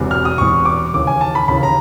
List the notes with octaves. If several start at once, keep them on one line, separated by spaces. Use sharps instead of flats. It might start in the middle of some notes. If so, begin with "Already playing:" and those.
Already playing: E1 E2 C3
F6
D#6
E1 E2 C3 C#6
D6
D#2 C#3 E3 D6
G#5
A5
B5
D#2 C#3 E3 B5
A#5